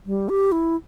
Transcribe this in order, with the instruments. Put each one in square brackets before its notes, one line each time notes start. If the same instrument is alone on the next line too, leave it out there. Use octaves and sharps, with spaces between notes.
[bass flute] G3
G4
E4